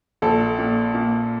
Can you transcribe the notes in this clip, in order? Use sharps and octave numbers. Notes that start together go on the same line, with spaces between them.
A#1 A4
A#2
A#2